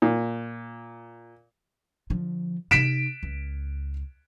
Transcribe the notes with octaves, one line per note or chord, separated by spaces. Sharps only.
A#2
D3 F3
C3 D#4 B6 D7 E7
C#2